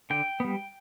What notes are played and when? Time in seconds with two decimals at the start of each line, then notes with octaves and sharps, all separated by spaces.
0.10 D3 G5
0.40 G3 B3